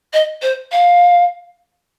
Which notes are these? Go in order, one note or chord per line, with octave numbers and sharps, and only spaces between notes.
D#5
C5
F5